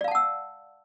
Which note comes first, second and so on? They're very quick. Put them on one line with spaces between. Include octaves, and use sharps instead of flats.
D5 F5 A5 F#5 E6